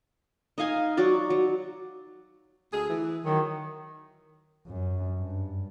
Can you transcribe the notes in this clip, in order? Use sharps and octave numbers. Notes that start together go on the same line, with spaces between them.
D#4 D#5 F5 G#5
F#3 D#4 F#4 D5
F#3
D2 G#4
E3
D#3 F#3
F#2
G2